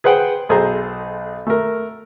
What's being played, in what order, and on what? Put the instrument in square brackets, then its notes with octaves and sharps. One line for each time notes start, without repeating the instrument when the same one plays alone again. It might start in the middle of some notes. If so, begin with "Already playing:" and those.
[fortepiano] G#4 B4 C5 F#5 G5
B1 G#4 A4 C5 A#5
A3 A#4